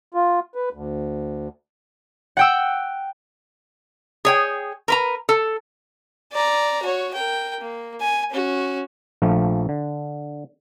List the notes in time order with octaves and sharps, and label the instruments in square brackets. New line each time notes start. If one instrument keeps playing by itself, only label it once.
[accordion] F4
B4
D2
[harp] F#5 G5 E6
[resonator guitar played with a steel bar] G#4 C#5 G5
A#4 B4 A#5
A4
[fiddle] D5 A#5
F#4 C#5
A#4 G5
A#3
G#5
C#4 F#4
[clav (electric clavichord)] A#1 F3 A3
D3